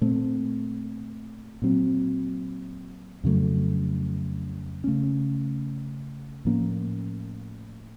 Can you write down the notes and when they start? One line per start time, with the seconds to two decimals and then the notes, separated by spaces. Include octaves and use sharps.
0.01 A#2 A3 C4
1.62 A#2 F#3 C4
3.23 F2 C#3 F#3 A3
4.84 C#3 A3 C#4
6.45 A2 F3 A#3 C#4